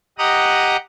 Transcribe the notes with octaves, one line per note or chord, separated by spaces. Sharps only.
G4 D#5 F#5 A#5 D#6